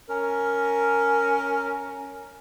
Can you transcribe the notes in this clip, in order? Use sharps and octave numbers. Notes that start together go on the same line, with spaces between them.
C#4 A#4